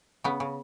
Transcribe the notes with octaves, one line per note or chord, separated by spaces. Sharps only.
C#3 B3
C#3